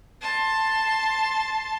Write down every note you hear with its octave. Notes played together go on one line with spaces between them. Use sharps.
A5 C6